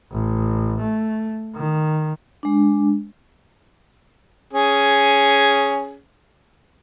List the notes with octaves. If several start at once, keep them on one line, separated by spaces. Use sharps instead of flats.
A1
A3
D#3
G#3 D4
C#4 G#4